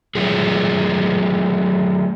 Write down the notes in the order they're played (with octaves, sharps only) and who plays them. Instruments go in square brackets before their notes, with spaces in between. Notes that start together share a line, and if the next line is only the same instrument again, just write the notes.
[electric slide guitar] F#3 A3 F4 G#4